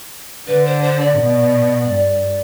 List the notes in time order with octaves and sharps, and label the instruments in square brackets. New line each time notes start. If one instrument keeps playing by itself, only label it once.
[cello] D3 [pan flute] B4
[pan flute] C5
C5
D5
[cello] B2
G2